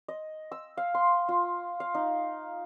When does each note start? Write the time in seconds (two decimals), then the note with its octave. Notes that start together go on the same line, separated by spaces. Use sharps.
0.08 D#5
0.52 E6
0.77 F5
0.94 C6
1.29 F4
1.80 F5
1.94 D#4